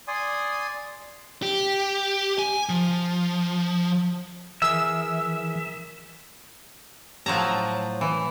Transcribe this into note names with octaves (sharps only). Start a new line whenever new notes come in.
D5 G#5 C6 D#6
G4
G#5
F3
E3 G#4 A#4 E5 E6
A2 F3 F#3 A5 A#5
E3